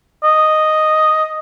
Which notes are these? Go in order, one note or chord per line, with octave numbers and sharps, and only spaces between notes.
D#5